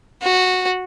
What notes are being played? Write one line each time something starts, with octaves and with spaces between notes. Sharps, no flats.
F#4